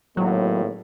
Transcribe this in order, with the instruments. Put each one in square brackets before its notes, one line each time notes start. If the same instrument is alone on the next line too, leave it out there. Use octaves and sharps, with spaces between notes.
[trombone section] G#1 A2 A#3 [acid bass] F#3